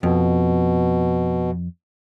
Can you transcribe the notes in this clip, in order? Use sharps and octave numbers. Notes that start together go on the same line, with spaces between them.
F2 B2